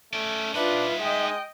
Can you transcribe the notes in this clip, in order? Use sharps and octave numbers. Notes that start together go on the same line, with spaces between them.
A3 C#4 D5
D4 D#4 F4 B4 E5 F#5
G#3 D#5 G5